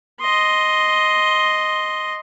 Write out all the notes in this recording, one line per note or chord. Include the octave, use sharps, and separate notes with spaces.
D#5 C6